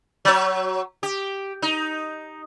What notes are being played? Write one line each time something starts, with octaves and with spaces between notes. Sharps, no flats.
F#3 C#5
G4
D#4